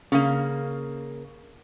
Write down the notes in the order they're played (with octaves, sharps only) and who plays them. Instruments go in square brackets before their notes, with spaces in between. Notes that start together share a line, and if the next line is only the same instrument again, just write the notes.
[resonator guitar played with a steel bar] C#3 A#3